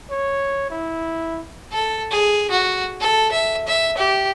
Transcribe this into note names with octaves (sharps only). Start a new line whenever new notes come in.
C#5
E4
A4
G#4
F#4
A4
E5
E5
G4